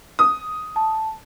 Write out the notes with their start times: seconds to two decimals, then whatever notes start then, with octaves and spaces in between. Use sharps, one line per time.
0.19 D#6
0.76 A5